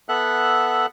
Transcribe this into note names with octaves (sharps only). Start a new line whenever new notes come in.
B3 A4 E5 F#5 F#6